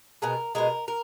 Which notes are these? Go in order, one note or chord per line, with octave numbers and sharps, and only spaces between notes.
B2 G#3 A#4
B2 G#3 A#4
A#4